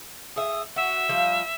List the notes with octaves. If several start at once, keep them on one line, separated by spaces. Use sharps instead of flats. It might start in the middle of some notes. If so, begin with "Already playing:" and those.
G#4 E5 D#6
F#4 E5
F3 G3